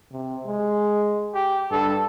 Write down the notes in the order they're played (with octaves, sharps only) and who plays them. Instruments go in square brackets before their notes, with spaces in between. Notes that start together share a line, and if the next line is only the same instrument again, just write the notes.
[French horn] C3
G#3
[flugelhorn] G4
[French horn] G2 [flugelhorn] A4